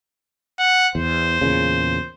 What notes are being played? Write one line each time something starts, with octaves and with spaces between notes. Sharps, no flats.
F#5
E2 C5
E2 A#2 C#3